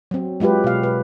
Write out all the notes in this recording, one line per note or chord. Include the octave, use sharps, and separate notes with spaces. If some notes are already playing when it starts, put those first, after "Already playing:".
F#3 C4
F#3 G#3 F4 G4 B4
B2 F5
B4